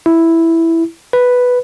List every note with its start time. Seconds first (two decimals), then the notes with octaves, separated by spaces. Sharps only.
0.06 E4
1.13 B4